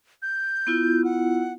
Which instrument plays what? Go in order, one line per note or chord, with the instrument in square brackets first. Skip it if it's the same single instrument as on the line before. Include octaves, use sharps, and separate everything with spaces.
[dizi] G6
[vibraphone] B3 E4 F4
[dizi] F#5